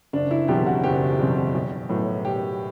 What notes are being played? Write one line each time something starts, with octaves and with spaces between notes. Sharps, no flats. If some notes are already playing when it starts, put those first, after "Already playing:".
F#1 D4
E4
E2 B2 F#3 C4 G4
F#4
F#1 G4
E2 B2 F#3 C4
B1
A2 F#3 B3
B1 G4